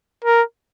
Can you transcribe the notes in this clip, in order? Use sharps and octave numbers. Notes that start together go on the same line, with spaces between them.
A#4